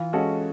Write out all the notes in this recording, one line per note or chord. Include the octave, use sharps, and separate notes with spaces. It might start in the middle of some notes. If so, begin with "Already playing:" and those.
Already playing: E3 F4
G#3 C#4 F#4 A4